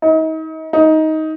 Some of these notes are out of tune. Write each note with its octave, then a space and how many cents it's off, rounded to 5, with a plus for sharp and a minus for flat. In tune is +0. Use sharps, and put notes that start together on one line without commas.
D#4 +35
D#4 +15